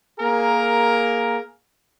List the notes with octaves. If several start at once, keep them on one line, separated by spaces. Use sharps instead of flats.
A#3 G#4 A#4